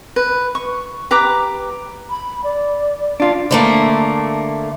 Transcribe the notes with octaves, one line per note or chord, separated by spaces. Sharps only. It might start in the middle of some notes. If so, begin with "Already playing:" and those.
B4
C#6
G4 B4 A#5 D6
B5
D5
D4 F4
D3 A3 A#3